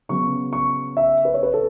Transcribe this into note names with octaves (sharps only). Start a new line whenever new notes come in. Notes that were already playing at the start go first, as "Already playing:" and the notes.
C#3 F#3 B3 C#6
C#6
E5
B4
C#5
B4
A4